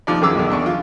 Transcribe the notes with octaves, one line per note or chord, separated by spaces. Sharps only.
F2 C3 F3 D#4 D5
F#2 D#3 G#4 D6 E6
B1 E2 D#3
E2 D4 C#6
F4